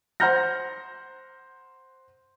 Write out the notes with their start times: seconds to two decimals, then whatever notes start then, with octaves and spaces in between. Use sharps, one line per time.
0.20 C5 F#5 A#5 F6 G6 A#6